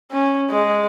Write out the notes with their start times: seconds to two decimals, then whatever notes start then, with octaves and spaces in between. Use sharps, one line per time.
0.11 C#4
0.50 G#3